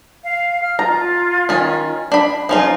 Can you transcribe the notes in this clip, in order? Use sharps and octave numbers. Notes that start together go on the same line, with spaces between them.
F5
F6
F4 A#5
D#3 C#4
D4 B5
F3 C#4 D#4 F4